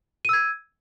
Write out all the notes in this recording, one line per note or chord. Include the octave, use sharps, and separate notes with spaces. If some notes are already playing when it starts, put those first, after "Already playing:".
E6 G#6 D#7